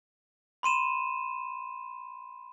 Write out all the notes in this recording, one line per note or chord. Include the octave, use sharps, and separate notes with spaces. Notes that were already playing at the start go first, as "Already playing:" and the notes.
B5 C6 D#7 E7